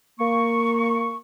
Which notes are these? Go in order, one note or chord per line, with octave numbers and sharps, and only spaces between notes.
A#3 C#6